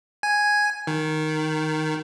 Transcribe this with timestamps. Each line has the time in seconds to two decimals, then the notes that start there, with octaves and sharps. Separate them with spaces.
0.23 G#5
0.87 D#3